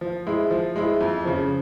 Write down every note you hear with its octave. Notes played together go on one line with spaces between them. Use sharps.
F3
G#3 E4
F3
G#3 E4
F2
C#3 F3